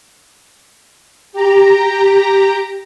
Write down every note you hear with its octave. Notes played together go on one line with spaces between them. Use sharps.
G4 A#5